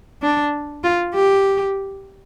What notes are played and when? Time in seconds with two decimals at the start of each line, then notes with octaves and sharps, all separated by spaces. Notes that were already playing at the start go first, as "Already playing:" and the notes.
0.22 D4
0.84 F4
1.15 G4